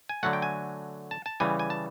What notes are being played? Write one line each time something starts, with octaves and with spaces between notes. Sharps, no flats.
G#5
D3 F#3 A3 F#5
G5
G#5
A5
A5
C#3 E3 G3 G#5
G#5
A5